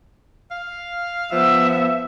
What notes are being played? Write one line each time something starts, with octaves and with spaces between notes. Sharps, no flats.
F5
F3 B3 E5